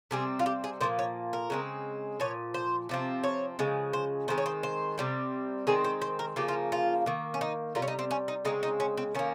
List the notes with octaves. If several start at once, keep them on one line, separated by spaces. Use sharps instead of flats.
C3 G3 C4 G#4
F4
G4
G#4
A#2 F3 A#3 C5
C#5
A#4
C#3 G#3 C4
A#2 F3 C#5
C5
C3 F3 C4
C#5
C#3 F3 G#3
C5
D#3 G#3 C4 C5
C#5
C5
C5
C3 G3 C4
D#3 G#3 C4 G#4
C5
C5
A#4
C#3 F3 A#3 G4
F4
F4
D#3 A#3
C#4
D#4
C3 G3 A#3 F4
C#4
D#4
C4
C#4
D#4
C#3 G#3 C4 D#4
D#4
C#4
C4
D#3 A#3 C#4